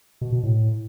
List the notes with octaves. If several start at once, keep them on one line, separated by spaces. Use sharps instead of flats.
B2
B2
A2